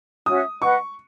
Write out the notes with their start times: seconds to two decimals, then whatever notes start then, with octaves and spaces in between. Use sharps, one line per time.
0.26 C#4 F#4 C#5 E5 D#6
0.62 B4 D#5 F#5 C#6